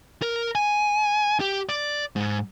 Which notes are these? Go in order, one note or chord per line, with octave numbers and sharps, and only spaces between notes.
A#4
G#5
G4
D5
G#2